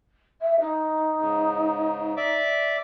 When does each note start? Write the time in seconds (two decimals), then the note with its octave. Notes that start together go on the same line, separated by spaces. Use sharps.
0.41 E5
0.59 D#4
1.19 G#2 C#3
2.17 D5 E5 D6